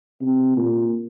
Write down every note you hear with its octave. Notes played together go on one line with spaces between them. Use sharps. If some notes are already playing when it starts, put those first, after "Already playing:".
C3
A#2